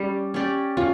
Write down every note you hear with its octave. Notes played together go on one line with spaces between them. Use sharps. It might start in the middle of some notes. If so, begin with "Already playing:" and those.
Already playing: G3 C#4 G4
C#4 G4 D5
C#4 F4